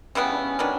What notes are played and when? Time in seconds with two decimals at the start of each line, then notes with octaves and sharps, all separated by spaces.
0.15 C#3 E3 G3 B3 C#4
0.29 D4
0.37 C#4
0.59 D#3 F#3 B3 D4